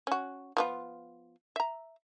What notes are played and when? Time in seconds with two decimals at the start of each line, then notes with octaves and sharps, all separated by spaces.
0.07 C#4 F#4
0.57 F3 B3 F4
1.56 E5 A#5